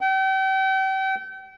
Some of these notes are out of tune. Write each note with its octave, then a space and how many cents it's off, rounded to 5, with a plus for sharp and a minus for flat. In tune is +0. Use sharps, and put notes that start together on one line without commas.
G5 -40